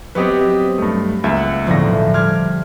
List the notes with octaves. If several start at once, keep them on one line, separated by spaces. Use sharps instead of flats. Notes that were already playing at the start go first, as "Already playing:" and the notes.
F#3 B3 C4 G4 B4 D#5
G2 A3
C#2 A#3 E5
F#5
B1 E2 A2 D3 F3 A#6
G3 G4 C6 F6 G#6